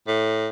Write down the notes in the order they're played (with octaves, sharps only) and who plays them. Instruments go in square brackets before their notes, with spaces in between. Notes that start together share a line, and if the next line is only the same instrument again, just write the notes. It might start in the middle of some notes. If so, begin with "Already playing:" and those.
[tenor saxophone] A2